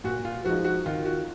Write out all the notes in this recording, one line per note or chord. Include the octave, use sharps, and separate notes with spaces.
A#2 F#4
F4
F3 G#3 D#4 F#4
F#4
D#3 F4
F#4